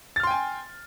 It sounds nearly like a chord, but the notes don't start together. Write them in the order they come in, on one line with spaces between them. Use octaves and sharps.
A6 F6 C6 G5 G#5